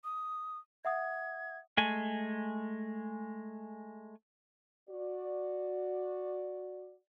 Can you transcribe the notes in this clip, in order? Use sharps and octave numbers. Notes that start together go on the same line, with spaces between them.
D#6
E5 F#5 D#6 G#6
G#3 A3 G#5
F#4 D5